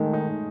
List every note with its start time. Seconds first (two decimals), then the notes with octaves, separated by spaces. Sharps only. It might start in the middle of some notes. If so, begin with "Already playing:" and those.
Already playing: D#3 G#3 A3
0.13 D#4